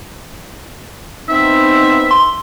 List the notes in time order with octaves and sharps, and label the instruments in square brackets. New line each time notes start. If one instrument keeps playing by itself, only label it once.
[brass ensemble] B3 D#4 [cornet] C4 [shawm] E5
[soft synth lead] C6